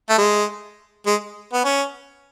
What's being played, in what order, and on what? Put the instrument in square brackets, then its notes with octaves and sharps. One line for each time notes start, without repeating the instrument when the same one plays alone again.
[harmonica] A3
G#3
G#3
B3
C#4